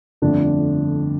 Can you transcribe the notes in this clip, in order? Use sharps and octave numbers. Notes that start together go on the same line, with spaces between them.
G1 F2 D3 A3 D4